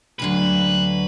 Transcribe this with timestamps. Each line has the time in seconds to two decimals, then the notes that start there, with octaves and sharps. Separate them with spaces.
0.19 D2 D3 F#3 B4